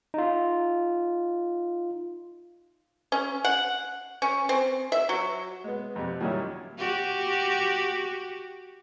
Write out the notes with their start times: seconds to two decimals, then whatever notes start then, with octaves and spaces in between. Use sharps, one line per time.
0.14 D#4 F4
3.12 C#4
3.44 F#5
4.22 C#4
4.49 C4
4.92 E5
5.09 F#3
5.64 G#3 B3
5.96 F2 C3
6.20 A#2 D#3 F#3 G3 C#4 E4
6.78 F#4 G4